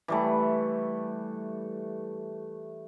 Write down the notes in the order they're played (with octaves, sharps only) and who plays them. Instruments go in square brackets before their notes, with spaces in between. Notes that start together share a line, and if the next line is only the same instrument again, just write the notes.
[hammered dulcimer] E3 G3 A3